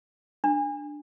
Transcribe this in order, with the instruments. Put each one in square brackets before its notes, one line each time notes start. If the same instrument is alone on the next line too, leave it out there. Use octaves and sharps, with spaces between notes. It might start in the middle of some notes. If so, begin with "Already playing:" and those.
[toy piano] D4